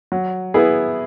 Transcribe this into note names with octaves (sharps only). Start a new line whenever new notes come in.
F#3
B3 E4 G#4